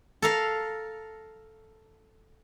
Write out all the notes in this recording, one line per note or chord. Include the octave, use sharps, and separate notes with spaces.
A4 A#4 F5